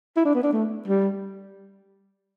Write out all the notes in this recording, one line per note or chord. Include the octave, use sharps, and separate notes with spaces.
E4
D4
B3
D4
A3
G3